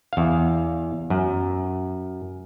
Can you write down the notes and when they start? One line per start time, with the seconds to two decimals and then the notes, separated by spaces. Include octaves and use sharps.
0.13 E2 F5
1.10 F#2